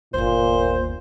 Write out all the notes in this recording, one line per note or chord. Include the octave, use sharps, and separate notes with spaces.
G1 D#2 A#2 C5